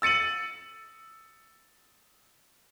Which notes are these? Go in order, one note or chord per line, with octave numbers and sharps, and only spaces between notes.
E6 A6 C#7 D#7 F#7